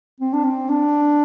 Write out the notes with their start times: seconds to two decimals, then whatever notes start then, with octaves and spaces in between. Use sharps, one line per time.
0.21 C4
0.33 D4
0.45 C4
0.69 D4